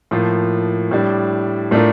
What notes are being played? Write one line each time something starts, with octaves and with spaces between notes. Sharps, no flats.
A2 F3 A#3 F4
A2 G3 D4
A2 A3 D4 F4 A#4